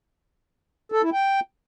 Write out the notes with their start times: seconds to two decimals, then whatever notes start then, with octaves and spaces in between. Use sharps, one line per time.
0.92 A4
1.02 E4
1.13 G5